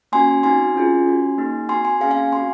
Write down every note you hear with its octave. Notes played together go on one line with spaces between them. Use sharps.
A#3 C#4 F#4 G#5 C6
C4 D#4 F#4 G#5 C6
C#4 F4 G#4
C#4 F#4
A#3 D#4 G#4
C4 F#4 G#5 C6
G#5 C6
A#3 C#4 G#4 F5 G#5
F5 G#5
C4 F#4 G#5 C6